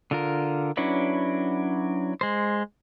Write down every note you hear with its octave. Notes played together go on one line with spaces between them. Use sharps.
D3 F4 A#4
F#3 C#4 D4 E4 B4
G#3 C5